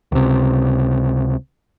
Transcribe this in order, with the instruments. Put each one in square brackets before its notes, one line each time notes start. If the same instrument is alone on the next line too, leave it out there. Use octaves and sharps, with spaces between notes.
[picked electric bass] C#2 C3